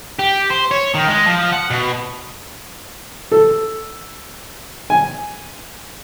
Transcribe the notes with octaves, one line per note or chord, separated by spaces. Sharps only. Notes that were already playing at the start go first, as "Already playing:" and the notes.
G4
C5
C#5
D#3
G#3
F3
F#5
B2
A4
G#5